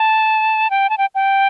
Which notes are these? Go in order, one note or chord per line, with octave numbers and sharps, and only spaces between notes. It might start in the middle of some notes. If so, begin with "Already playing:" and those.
Already playing: A5
G5
A5
G5
G5